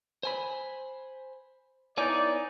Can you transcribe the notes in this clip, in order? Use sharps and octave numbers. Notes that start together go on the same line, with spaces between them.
C5 G#5 B5
B3 D#4 E4 C#5 D5 G#5